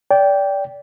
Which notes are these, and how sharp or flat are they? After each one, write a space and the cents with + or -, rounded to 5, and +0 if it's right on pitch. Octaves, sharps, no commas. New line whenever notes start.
D5 -25 G5 +0